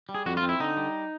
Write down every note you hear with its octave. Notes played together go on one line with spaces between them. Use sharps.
G3
G#4
F2 F#4
F4
C4
E4
D3 D#4
G3